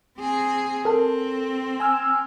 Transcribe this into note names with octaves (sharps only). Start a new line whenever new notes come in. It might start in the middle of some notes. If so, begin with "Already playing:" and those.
C4 G#4
C4 A4 A#4 A5
G#5 E6 F6